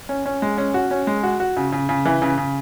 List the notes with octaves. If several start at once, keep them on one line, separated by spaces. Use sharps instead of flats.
C#4
C#4
G#3
C#4
F#4
C#4
G#3
F#4
F#4
C#3
C#3
C#3
E3
C#3
C#3